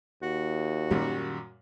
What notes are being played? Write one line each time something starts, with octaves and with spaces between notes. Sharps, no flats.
D#2 F#4
F#2 A#2 D#3 G3